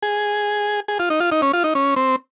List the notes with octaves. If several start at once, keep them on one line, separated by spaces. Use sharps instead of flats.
G#4
G#4
F4
D#4
F4
D#4
C#4
F4
D#4
C#4
C4